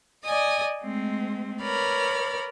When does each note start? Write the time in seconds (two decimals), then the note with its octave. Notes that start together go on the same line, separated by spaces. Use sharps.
0.23 D5 D#5 G#5 D#6
0.83 G#3 A3 C4
1.62 A#4 B4 C#5 D5 B5 F6